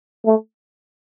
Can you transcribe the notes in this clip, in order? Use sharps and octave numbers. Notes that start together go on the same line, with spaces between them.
A3